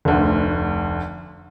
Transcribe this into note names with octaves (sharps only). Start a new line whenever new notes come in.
F1 D2